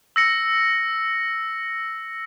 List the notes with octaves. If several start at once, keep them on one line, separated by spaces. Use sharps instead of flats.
E6 A#6 C#7